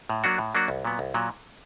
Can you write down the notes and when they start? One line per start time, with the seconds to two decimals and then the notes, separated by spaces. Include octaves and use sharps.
0.10 A2
0.24 F#3 A#3 D4 F#4
0.38 A2
0.55 F#3 A#3 D4 F#4
0.68 C2
0.85 A#2 F#3 B3
0.99 C2
1.14 A#2 F#3